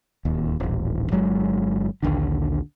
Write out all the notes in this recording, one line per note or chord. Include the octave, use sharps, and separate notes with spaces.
D1 D#2
D#1 A1
G1 F#3 G#3
A#1 D#2 D3